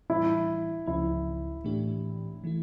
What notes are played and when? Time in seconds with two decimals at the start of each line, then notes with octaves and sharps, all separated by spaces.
0.10 A2 E3 G3 D4 E4
0.86 C#2 C#3 F3 C#4 E4
1.64 A2 E3 A3 D4 G4
2.44 E3 A3 E4